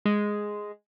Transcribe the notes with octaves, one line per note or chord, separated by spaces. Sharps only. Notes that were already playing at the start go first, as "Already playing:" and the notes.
G#3